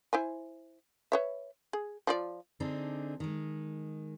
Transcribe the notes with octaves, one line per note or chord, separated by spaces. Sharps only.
E4 C5 G#5
B4 C#5 E5
G#4
F3 F4 D5
D3 C4 D4 D#4 G#4
D#3 G#3